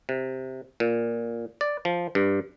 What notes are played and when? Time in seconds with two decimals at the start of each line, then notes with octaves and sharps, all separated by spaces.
0.09 C3
0.80 A#2
1.61 D5
1.85 F3
2.15 G2